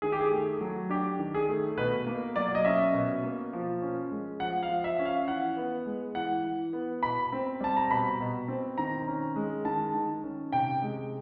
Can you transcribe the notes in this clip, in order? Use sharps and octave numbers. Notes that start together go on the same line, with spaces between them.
D#3 G#4
G4
G#4
A3
F#3
D4 G4
D#3
G#4
A3
B2 B4
A#3
F#3 D5
D#5
C#4 E5
B2
A#3
F3
C#4
G#3
F3 F#5
F5
F3
E5
C#4
F5
E3 F#5
B3
G#3
E3 F#5
E3
B3
B2 B5
C4
G3 A5
A#5
B2 B5
B2
C4
D#3 A#5
C#4
G#3
D#3 A5
D#3
C#4
C3 G5
G#3